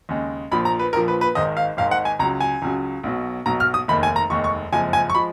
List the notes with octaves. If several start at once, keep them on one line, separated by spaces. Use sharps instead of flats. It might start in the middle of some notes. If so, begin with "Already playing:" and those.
D#2 C#3 G#3
A#1 A#2 F3 B5
A#5
B4
A#1 A#2 F3 A#4
B4
B4
G#1 G#2 D#3 G#3 D#5
F5
G#1 G#2 D#3 G#3 F5
F#5
G#5
C#2 C#3 F#3 A#5
G#5
C#2 C#3 F#3
B1 B2 F#3
B1 B2 F#3 A#5
F6
D#6
F1 D#2 D#3 G#3 B5
G#5
A#5
F1 D#2 D#3 G#3 C#6
C#6
F#1 F2 F3 G#3 G#5
G#5
C#6
F3 G#3 B5